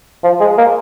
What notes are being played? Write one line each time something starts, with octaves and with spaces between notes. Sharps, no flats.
F3
G#3
A#3